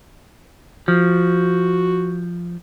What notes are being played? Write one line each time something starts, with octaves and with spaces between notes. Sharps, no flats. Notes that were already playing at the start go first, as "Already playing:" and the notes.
F3 F#4